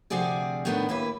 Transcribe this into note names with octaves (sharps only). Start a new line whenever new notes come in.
D2 C3 F3 F#4 G#4 D5
A2 D#3 B3 C4 D4
D#2 A#3 E4 B4